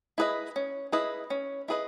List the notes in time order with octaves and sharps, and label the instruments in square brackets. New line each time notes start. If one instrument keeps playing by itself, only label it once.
[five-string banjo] E4 G#4 B4 D#5
C#4
E4 G#4 B4 D#5
C#4
E4 G#4 B4 D#5